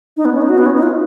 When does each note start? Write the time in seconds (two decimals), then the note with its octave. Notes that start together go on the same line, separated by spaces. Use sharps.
0.17 D#4
0.25 B3
0.34 C#4
0.42 D#4
0.49 F#4
0.58 B3
0.66 C#4
0.75 D#4
0.83 F4